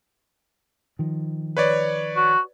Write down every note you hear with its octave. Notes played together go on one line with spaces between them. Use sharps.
D#3 F3
B4 C#5 D5
F#4